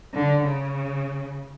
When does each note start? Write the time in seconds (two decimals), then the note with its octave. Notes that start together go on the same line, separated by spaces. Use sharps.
0.14 D3
0.44 C#3